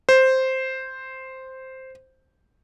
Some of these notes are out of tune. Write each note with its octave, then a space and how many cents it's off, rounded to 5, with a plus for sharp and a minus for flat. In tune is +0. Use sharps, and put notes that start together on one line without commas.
C5 +0